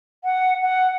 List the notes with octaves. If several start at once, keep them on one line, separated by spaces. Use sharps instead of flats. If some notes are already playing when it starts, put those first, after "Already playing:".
F#5
F#5